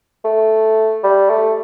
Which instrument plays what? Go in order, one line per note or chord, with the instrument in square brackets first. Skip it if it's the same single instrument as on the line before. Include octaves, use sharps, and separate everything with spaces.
[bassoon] A3
G3
A3